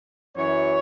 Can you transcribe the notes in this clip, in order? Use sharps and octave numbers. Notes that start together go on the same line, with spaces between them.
F#2 E3 C#5